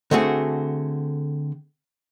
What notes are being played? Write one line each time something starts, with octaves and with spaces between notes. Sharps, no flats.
D3 A3 C4 F#4 G#4